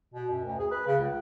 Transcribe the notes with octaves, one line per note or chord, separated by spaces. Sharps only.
B2
F#2
D2
G#4
B4
C#3
C#2